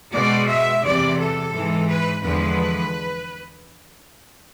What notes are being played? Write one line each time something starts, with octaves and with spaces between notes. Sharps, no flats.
B2 G#3 D5
E5
E2 C3 E3 D5
A4
G#2 E3 G#3
B4
E2 D3 F3 G#3 B4